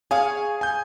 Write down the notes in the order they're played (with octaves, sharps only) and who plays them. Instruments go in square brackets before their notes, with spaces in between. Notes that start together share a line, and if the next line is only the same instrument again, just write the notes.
[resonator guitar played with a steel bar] G#4 C#5 F5 [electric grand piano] G#5 D#6
[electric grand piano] G#5 G6